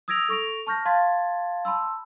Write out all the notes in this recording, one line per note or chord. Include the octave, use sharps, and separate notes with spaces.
D#6 E6 G#6 A#6 D7 F7
A4 C#6 A#6 D7 F7
A5 C#6 F6 G6 A#6
F5 A5 C6 G#6 A6 B6
A5 B5 C6 E6